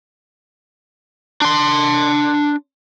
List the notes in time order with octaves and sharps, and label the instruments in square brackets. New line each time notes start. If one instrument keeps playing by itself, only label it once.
[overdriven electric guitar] D4 C6